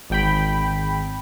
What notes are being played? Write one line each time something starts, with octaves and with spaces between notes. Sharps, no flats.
G#1 G5 B5